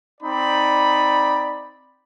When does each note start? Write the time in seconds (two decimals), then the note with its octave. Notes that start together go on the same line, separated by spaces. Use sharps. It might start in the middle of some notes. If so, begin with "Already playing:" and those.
0.21 C4 D#4 D5 B5